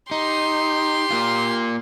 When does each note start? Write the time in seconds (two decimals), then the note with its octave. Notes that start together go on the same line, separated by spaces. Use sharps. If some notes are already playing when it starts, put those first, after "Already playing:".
0.11 D#4 G4 C6
1.11 A#3 F4